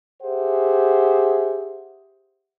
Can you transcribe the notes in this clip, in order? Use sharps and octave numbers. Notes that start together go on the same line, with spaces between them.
G4 G#4 C5 E5 F#5